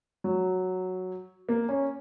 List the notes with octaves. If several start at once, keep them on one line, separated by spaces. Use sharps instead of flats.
F#3
A#3
C#4